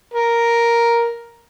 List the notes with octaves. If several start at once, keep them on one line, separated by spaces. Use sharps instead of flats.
A#4